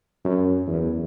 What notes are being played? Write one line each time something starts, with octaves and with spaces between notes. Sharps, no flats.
F#2
E2